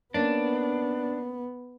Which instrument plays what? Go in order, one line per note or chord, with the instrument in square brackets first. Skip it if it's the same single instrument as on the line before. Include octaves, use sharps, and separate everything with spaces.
[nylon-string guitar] A#3 C#4 [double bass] B3 [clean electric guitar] D4